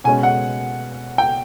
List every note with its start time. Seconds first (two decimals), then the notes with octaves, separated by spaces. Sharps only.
0.04 B2 G#3 C#4 G#5
0.23 F#5
1.18 G5